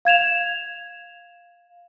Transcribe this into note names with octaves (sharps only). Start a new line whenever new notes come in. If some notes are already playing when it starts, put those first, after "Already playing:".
F5 G#6 E7 F7